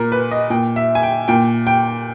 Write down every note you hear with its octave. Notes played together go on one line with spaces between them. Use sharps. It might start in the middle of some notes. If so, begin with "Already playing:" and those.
Already playing: A#2 A#4
B4
D#5
A#2 G5
E5
G#5
G5
A#2 G5
G5